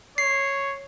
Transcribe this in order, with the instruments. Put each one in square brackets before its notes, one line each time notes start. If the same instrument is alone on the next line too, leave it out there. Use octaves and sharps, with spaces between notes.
[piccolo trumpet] C#5 [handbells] C7